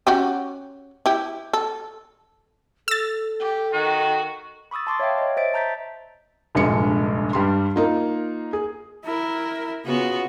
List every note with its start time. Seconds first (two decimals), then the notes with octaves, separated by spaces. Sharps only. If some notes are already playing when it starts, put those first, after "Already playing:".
0.07 C#4 F#4 G4
1.06 E4 G4
1.53 A4
2.88 A4 E6 A6
3.40 G4
3.73 D#3 F#4
4.71 B5 C#6 D#6 E6 A6
4.87 A5 C6 D6 A6
5.00 C#5 E5 F5 G5
5.18 C#5 D#5
5.37 C5 D#5 E5 A6 D7
5.54 A5 A#5 G6 A6 B6
6.55 F1 A#1 G2 G#3 C#7
7.33 G2 G3 C6
7.76 A#3 D#4 F4
8.53 G#4
9.05 E4 A#4
9.85 C#3 B3 F4 F#4